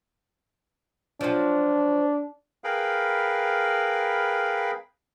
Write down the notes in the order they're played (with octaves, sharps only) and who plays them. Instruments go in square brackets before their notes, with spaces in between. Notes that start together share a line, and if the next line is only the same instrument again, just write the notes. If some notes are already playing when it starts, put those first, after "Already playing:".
[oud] F3 F#3 [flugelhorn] D4
[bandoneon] G#4 A#4 B4 F5 G5 B5